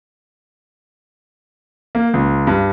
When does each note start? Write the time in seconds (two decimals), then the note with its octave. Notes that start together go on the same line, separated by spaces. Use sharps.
1.95 A#3
2.14 C#2
2.47 G2